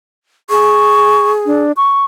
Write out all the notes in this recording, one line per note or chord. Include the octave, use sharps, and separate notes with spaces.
G#4 C#6
D4
C#6